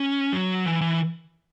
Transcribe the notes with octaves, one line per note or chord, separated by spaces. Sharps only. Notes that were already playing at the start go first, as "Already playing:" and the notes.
Already playing: C#4
F#3
E3
E3